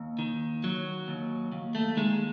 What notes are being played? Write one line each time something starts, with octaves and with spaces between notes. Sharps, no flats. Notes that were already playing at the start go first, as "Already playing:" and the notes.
Already playing: D#2
D#3
F#3
D#2
D#2
A3
D#3 G#3